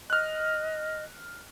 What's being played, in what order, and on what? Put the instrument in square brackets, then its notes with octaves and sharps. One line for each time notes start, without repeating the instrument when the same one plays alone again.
[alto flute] D#5 [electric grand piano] F6 F#6